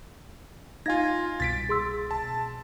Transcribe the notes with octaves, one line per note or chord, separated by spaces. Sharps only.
D#4 F4 F5 G#5 G#6 A#6
C2 B2 A6 B6 D7
G#4 C6 E6
A5